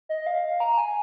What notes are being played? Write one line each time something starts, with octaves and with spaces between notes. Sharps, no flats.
D#5
F5
A#5
G#5